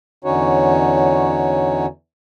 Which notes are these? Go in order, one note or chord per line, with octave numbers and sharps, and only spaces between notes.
E2 D3 C#4 D#4 F#4 C#5